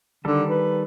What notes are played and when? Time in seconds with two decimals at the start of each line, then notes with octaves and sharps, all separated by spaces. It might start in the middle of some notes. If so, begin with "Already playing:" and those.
0.25 D3 D#3 G3 A4
0.49 B4